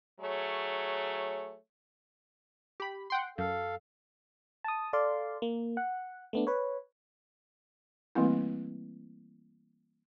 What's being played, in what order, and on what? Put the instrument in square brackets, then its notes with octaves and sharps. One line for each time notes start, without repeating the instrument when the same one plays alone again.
[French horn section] F#3 A3 G#4 C#5
[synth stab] G4 B5
F#5 G5 C6
[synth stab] F#2 [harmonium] A4 F5
[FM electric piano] A5 D#6
A4 D5 F5 C6
A#3
F#5
A3 B3 D4
B4 C#5
[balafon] E3 G3 A3 A#3 C4 E4